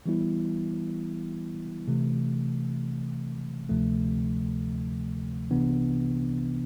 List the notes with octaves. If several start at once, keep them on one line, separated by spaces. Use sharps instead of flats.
E3 G3 B3 E4
C3 E3 A3
D2 C3 F3 A3
C2 C3 E3 B3 D4